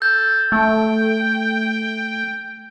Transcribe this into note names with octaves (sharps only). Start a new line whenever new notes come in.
A4 G6
A3 G5